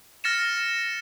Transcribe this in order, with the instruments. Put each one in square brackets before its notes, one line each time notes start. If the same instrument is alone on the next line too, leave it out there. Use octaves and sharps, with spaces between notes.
[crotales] F6 A6 A#6 C#7 E7